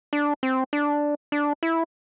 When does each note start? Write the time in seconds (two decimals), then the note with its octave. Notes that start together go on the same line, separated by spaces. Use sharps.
0.13 D4
0.43 C4
0.73 D4
1.32 D4
1.63 E4